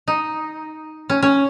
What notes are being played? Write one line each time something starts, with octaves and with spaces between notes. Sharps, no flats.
D#4
C#4
C#4